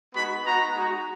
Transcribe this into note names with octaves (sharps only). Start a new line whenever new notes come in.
G#3 B3 D#4 F#4 B5
B3 D#4 F#4 A#5
G#3 D#4 F#4